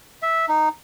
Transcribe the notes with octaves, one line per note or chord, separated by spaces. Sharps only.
E5
D#4